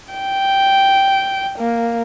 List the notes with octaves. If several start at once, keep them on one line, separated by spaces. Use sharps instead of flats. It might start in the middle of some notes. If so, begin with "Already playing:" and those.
G5
A#3